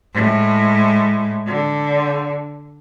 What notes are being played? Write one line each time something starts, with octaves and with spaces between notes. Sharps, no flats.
A2 G#3
D3